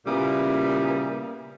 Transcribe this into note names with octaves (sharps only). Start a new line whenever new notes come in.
A#2 C#3 G3 A#3 B3 E4